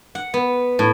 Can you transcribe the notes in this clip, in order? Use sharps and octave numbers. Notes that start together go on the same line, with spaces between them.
F#5
B3
A2